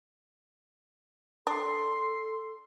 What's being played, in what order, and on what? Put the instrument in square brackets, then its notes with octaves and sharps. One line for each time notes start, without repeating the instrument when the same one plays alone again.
[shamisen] D4 [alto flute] A4 [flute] C6